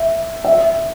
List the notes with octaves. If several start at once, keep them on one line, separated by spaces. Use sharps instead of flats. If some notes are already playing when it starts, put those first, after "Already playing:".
Already playing: E5
E5